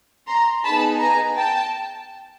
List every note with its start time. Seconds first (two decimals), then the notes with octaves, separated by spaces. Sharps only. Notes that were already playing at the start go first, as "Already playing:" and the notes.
0.27 A#5 C6
0.64 B3 D#4 G#4 A5 B5
1.01 G#5 A#5
1.37 G5 A5